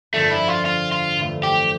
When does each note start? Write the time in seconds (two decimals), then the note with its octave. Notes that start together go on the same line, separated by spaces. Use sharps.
0.13 G1 F2 D3 F3 A3 A#3
0.30 E4
0.48 F4
0.65 F4
0.92 F4
1.18 G1 F2 E3 A3
1.43 G4